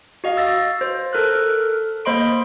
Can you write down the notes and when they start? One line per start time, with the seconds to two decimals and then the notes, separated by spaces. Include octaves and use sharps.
0.24 F#4 D#5 F5
0.37 E6 A6 A#6
0.81 C5
1.13 A4 A#4 F6 F#6
2.05 A#3 C5 D#5 B5 C6 D7